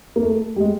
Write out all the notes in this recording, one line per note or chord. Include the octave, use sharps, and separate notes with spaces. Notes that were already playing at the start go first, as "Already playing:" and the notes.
A#3
A3
G3
G#3